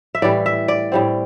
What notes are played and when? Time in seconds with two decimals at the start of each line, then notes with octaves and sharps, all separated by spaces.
0.15 E5
0.22 A2 E3 G3 D5
0.46 E5
0.68 D5
0.92 A2 G3 C4